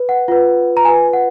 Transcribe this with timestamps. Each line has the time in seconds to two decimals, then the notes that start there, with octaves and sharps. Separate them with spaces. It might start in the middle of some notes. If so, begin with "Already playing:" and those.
Already playing: B4
0.09 F#5
0.28 F4 B4 F#5
0.77 A#5
0.85 F4 B4 G#5
1.13 F#5